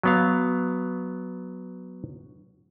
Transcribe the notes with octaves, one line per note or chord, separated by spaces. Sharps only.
F#3 B3 F5